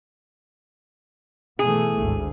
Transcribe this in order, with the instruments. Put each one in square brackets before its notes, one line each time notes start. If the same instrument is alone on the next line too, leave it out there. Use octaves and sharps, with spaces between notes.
[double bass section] B2 E3 A3 [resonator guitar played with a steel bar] G#4
[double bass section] G#1 D2